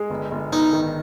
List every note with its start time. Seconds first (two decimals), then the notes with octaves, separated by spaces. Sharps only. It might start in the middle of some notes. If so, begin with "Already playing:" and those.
Already playing: G#3
0.10 G1
0.31 G1
0.52 G1 D#4
0.73 D#3